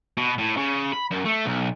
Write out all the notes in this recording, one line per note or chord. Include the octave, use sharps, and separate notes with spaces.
B2
A2
C#3
B5
F#2
A3
B1